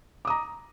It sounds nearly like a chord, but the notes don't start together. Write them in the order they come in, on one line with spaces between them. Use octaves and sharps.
D6 D#6 A#5